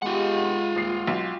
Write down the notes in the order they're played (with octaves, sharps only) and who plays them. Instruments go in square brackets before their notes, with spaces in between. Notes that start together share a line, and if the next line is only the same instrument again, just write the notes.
[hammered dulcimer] G#3 B3 G4 [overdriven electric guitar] F4 F#5
[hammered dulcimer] C6 C#6
[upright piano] D#1 C7
[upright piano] B1 [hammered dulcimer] G5